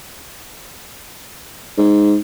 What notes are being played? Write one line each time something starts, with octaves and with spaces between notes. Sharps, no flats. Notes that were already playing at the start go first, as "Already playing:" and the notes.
G#2